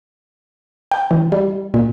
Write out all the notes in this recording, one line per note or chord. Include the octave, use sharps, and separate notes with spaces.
G5
E3
G3
A#2